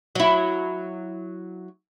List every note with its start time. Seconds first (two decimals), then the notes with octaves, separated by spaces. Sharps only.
0.15 F#3 E4